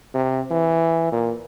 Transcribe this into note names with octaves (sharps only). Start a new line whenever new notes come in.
C3
E3
A#2